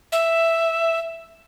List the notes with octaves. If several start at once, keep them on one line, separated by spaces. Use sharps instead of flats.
E5